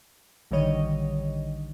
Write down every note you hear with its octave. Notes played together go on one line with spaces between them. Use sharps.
A#1 D3 D#3 G3 C#5 D#5